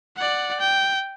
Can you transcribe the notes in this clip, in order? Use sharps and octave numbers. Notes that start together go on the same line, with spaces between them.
D5 F#5
G5